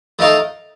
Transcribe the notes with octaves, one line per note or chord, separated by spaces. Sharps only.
A3 D#4 A#4 F5